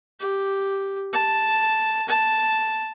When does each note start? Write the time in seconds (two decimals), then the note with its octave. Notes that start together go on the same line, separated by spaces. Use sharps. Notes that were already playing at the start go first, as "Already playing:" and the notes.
0.20 G4
1.13 A5
2.08 A5